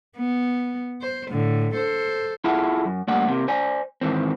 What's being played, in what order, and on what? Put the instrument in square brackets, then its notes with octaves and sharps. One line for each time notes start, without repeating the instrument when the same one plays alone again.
[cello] B3
C5
A2 D3
A4 C5
[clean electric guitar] E4 F4 G#4 A4 E5 F#5
F#2
G2 G3 A3 A#3 D5 F#5
C3 A#3
C5 D5 G#5
G#2 D#3 E3 C4